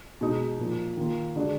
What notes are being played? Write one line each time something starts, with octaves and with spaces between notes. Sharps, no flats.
B2 G#3 D#4
A#2 F3 A#3
D#3 A#3 F4
D3 G#3 D4 F#4